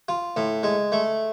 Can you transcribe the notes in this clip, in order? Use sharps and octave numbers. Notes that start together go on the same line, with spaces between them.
F4
A2
G#3
A3